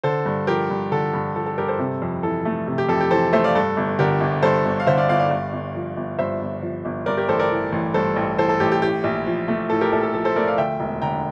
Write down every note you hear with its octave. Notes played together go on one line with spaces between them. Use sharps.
D3 A4 C5
G2
F3 G4 A#4
G2
D3 A4
G2
F3 A4
A4
G2 G4 A#4
A4 C5
C3
F2
E3 A4
A3
C3
G4
F2 A4
G4
E3 A4 C5
A3 C5 E5
D5 F5
G2 A4
G1
D3 G4 A#4
G1
G2 A4 C5
G1
F5
D3 C5 E5
D5 F5
G1 D5 F5
D5 F5
G2
G1
F3
G1
G2 C5 E5
G1
F3
G1
G2 A#4 D5
G4 A#4
A1 A4 C5
A#4 D5
E3
A1
G2 A4 C5
A1
E3 A4 C5
A4
A1 G4
G4
A2 G4
A#1
F3
A3
A2 A4
G4 A#4
A#1 A4
A4
F3 A4
A4 C5
A3 A#4 D5
D5 F5
D2 E5 G5
E1
D3 G5 A#5